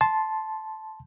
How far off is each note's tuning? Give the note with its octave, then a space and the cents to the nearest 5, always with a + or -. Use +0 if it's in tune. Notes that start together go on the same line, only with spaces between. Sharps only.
A5 -10 C6 +0